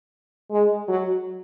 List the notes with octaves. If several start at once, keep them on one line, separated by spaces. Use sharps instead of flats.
G#3
F#3